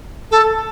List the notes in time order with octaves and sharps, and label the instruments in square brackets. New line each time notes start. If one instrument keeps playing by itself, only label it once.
[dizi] A4